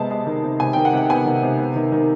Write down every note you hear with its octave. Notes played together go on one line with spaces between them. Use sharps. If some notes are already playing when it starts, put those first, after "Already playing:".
Already playing: C3 G#3 B3 A5
G#3
D#3
C3
C3 G#5
D#3 G5
F#5
C3 G5
B3 G#5
D#3
C3
B3
D#3
D#3